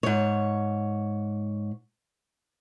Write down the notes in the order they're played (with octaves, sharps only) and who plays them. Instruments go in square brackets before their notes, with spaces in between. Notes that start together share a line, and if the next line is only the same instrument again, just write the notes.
[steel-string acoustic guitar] G#2 C#5